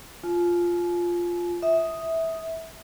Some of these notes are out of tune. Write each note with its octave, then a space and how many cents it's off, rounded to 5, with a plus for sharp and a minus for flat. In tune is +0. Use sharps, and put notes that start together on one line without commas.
F4 +0 G#5 +45
E5 -15 D#6 +0